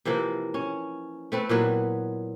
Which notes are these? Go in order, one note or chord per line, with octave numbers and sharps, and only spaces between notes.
C3 E3 F3 A#3
C#4
A3 C4 B4
A#2 E3 F#3 B3